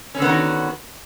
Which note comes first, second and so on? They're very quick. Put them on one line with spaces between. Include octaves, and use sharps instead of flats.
C#4 D3 B3 D#3 F#4